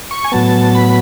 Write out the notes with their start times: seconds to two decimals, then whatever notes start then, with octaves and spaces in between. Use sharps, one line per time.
0.11 C#6
0.24 G#5
0.32 A2 F#3 B3 A5
0.75 B5